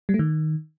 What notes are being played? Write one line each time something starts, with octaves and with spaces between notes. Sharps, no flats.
G3
A3
D#3